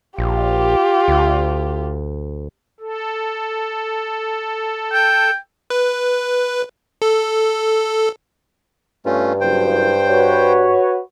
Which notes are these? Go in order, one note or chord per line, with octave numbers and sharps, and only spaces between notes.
A#1 F4 G4
D2
A4
G5
B4
A4
G2 A3 C#4 F4
F#1 C5 G5
F#4 B4 C#5